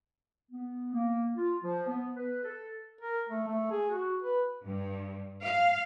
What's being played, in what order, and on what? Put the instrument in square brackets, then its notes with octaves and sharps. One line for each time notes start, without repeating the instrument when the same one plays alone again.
[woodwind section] B3
A#3
F4
F3
B3
B4
A4
[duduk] A#4
A3
A3
G#4
F#4
B4
[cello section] G2
F5